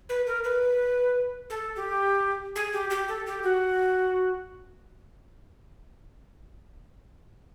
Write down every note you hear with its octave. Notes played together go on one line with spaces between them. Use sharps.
B4
A#4
B4
A4
G4
G#4
G4
G4
A4
G4
F#4